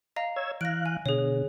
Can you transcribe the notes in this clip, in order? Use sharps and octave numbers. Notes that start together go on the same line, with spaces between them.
D#5 F5 A#5
C#5 E6 G#6
E3 F5 F#6 A#6 D7
G#5
B2 D3 G#4 C#5